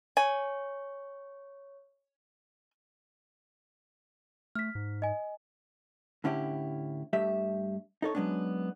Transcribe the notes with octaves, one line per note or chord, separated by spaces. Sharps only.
C#5 G#5 C#6
A3 F6 B6
G#2
D#5 G#5
A2 D3 C#4 E4 G4
G2 A3 G4 E5
D#4 A4 C#5
F#3 G#3 B3 C#4 D4